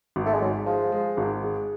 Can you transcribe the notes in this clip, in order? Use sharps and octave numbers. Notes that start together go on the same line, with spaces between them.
G#1
A3
G#3
G#2 F#3
F3 G#3
G#3
G#1
G#3